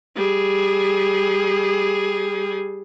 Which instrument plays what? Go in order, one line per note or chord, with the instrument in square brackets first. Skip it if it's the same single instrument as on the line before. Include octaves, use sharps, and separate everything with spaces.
[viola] G3 G#4